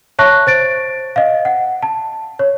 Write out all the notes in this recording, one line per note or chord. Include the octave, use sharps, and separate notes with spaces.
C#5 E5 A5 C#6 F#6 A#6
C5 A6 D7
D#5 F5
F#5
A5
C#5